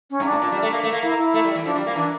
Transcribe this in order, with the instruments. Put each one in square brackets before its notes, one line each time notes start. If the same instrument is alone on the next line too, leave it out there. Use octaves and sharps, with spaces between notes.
[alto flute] C#4
[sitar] G2
[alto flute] D4
[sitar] A2
A#2
G3
A3
A#3
A3
A#3
[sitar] A#3 [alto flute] E4
[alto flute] E4
[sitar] A3
G3
E3
[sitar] F3 [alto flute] D4
[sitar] G3
A#3
[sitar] E3 [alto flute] D4